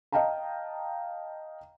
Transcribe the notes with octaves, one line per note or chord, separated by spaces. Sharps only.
D#5 F5 G5 A5 A#5